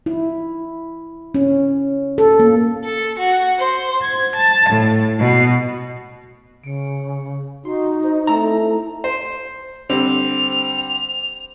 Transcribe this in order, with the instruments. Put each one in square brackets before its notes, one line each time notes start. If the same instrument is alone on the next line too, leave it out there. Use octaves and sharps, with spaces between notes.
[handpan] E4
C#4
A4
A#3
[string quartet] A4
F#4
C5
G#6
A5
A2
B2
[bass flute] C#3 [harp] C#7 D7
[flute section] D#4 [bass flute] F#4 [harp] C6
[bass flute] C5
[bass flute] A3 [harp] C4 E4 A4 [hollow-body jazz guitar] A#5
[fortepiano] C5
[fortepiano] D3 G3 C4 [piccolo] F7